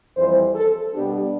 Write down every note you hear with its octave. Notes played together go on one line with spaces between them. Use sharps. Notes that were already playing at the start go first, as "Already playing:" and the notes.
F2 E3 G3 C5
A4
B2 G3 B3 D4 G4